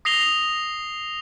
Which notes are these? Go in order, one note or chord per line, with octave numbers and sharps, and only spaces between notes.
D#6 A#6 C7 F7 G7